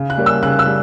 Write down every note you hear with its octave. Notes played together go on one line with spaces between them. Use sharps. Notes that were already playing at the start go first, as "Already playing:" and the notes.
Already playing: C#3
F#6
G3 A#3 C#4
E6
C#3 F#6
E6
G3